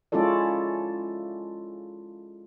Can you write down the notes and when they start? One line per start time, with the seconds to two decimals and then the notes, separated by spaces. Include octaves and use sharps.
0.12 G#3 C#4 E4 F4 A4 D5